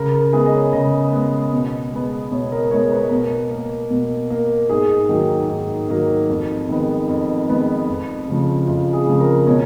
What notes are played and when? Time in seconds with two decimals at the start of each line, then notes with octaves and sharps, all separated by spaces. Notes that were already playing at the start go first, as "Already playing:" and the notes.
Already playing: C#3 A#4
0.13 A#4
0.33 G#3 B3 G#4
0.46 D#5
0.53 C#5
0.73 C#3 D#5
1.13 G#3 B3
1.52 B2
1.92 G#3 B3
2.32 B2 C#5
2.52 A#4
2.71 G#3 B3 C#5
2.92 B4
3.11 B2 A#4
3.51 A#3
3.90 B2
4.30 A#3
4.69 G#2 G#4
5.09 D#3 F#3 A#3
5.49 G#2
5.89 D#3 F#3 A#3
6.29 F2
6.69 D#3 G#3 B3
7.08 F2
7.48 D#3 G#3 B3
7.88 F2
8.28 C#3 F3
8.67 F2 F4
8.93 G#4
9.07 C#3 F3
9.20 A#4
9.47 B2 C#5